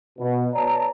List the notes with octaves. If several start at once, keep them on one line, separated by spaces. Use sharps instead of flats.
B2
B4 C#5 D5 A5 A#5